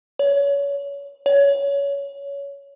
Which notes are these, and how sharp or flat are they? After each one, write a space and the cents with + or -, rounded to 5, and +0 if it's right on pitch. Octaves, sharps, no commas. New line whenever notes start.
C#5 +30
C#5 +20